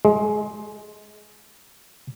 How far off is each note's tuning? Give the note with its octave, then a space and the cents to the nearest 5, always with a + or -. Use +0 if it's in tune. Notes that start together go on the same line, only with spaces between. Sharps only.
G#3 +20